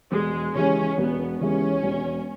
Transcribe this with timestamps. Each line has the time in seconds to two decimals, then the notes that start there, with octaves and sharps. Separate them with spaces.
0.11 E1 G#3
0.55 D#2 C#3 E3 G#3 C#4
0.97 E1 B3
1.40 D#2 C#3 E3 G#3 C#4
1.83 E1